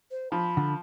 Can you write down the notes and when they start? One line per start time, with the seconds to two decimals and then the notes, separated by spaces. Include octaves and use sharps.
0.11 C5
0.32 F3 B5
0.57 D3